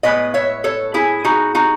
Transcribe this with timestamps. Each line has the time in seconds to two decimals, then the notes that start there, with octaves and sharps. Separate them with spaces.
0.03 A2 G#3 B3 B4 D#5
0.34 C#5 E5
0.64 A4 C#5
0.94 E4 G#4
1.24 D#4 F#4
1.55 D#4 F#4